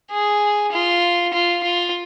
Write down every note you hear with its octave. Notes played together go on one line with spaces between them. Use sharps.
G#4
F4
F4
F4